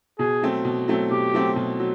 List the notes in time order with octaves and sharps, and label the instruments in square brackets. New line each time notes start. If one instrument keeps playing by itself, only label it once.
[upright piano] B2 [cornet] G#4
[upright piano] F#3 A3 C4
B2
F#3 A3 C4
[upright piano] B2 [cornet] G4
[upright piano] F#3 A3 C4
B2
F#3